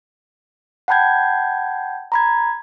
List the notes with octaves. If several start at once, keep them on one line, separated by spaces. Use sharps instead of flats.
F#5 G5 A5 B5 G6 G#6
A#5 B5 G#6